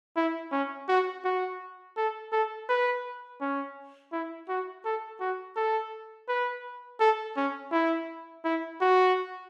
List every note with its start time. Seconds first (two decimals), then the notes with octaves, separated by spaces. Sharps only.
0.16 E4
0.52 C#4
0.89 F#4
1.25 F#4
1.97 A4
2.32 A4
2.69 B4
3.41 C#4
4.12 E4
4.49 F#4
4.85 A4
5.20 F#4
5.56 A4
6.29 B4
7.00 A4
7.36 C#4
7.72 E4
8.45 E4
8.81 F#4